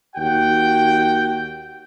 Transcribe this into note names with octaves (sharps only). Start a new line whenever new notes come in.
D#2 F#4 F#5 G5